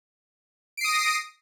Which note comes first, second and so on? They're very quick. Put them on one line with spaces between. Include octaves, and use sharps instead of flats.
D7 C7 D#6 A#6